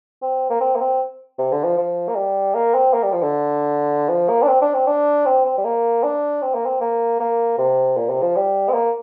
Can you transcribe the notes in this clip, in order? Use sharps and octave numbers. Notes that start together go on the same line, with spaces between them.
C4
A#3
C4
A#3
C4
C3
D3
F3
F3
A#3
G3
A#3
C4
A#3
G3
F3
D3
F3
A#3
D4
C4
D4
C4
D4
C4
C4
G3
A#3
D4
C4
A#3
C4
A#3
A#3
C3
A#2
C3
F3
G3
C4
A#3